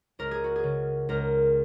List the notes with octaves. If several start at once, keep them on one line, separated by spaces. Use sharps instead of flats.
C#2 A#4
G#4
F#4
G#4
C#3
C#2 A#4